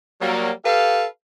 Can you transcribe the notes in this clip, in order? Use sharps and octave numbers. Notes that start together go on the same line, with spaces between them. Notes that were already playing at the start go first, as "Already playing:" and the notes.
F#3 G3 A#3
G4 A4 B4 F5